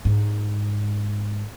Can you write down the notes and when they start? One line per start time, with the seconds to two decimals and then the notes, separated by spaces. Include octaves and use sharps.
0.05 G#2